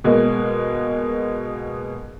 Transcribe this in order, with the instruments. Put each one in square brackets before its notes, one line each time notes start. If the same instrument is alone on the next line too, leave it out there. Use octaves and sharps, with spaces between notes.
[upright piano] B2 G#3 A#3